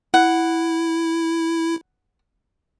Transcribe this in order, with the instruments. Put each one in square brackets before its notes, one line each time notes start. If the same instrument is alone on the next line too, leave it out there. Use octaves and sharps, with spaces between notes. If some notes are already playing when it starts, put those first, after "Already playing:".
[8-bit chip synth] E4 [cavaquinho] F#5